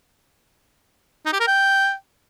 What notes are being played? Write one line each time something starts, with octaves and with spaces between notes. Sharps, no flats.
D#4
G4
A#4
G5